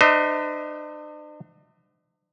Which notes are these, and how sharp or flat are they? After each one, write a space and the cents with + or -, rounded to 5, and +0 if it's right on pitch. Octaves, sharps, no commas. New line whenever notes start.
D4 +45 C5 -40 D#5 +40